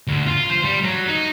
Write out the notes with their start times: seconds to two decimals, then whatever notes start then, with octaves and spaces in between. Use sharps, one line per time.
0.07 D2
0.26 F4
0.50 C5
0.65 G3
0.84 F#3
1.07 D#4